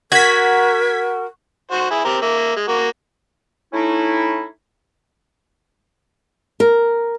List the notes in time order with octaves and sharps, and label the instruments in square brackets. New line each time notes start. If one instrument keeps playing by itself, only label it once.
[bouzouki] F#4 [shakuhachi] A#4 [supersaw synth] G#6 B6
[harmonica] F#4 C5
E4 G#4
C4 G4 A#4
A#3 E5
G#3
A#3 F#4
[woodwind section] A3 C#4 D#4 E4
[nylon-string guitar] A#4